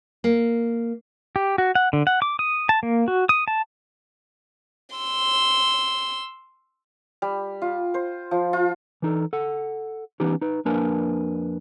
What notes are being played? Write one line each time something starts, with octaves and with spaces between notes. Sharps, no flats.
A#3
G4
F#4
F#5
D3
F#5
D6
D#6
A5
A#3
F#4
D#6
A5
C6 E6
G3
F4
C5
F3
F4
E3 D#4 A4
A4 F#5
E3 B3 C#4 D#4 G4
D#4 B4
F2 A#3 D4 A#4 B4 G#5